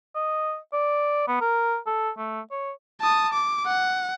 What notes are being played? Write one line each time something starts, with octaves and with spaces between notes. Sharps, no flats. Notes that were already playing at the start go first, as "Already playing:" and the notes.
D#5
D5
B3
A#4
A4
A3
C#5
A5 D#6
D6
F#5